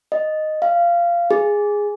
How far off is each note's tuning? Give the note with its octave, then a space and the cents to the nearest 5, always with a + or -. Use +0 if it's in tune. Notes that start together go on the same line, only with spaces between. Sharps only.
D#5 -5
F5 -15
G#4 -5